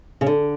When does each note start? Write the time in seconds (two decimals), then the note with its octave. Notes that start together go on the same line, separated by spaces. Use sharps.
0.21 C#3
0.26 D3